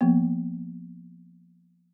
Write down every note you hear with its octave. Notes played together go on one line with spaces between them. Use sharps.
F3 A#3 B3